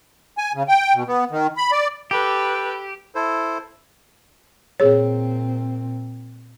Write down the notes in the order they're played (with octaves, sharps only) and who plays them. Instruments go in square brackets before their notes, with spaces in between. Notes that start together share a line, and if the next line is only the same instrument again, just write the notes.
[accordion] G#5
C#3
G5
B2
B3
D#3
B5
D5
[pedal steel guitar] G4 [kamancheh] A4 B4
[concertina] E4 A4 C5
[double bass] A#2 C4 [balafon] G#4 C#5